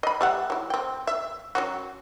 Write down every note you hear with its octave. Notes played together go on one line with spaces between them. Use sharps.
D#5 B5
G3 E5 F#5
F#3 E4
C4 G5
E5
F#3 C#4 F#4